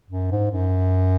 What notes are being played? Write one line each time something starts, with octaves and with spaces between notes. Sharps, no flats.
F#2
G#2
F#2